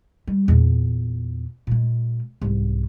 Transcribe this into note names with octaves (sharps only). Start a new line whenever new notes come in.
G3
E2 A#2
A#2 G#3
C2 G#2